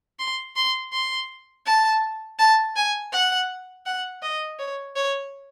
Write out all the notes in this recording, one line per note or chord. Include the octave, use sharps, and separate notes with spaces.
C6
C6
C6
A5
A5
G#5
F#5
F#5
D#5
C#5
C#5